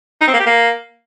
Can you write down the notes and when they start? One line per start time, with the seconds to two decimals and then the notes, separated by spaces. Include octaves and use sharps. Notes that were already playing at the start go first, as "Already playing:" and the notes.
0.21 D#4
0.27 C4
0.33 A#3
0.40 G4
0.46 A#3